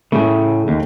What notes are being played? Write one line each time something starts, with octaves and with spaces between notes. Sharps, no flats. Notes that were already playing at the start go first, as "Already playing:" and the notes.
A2 C#3 A3 G#4
D#2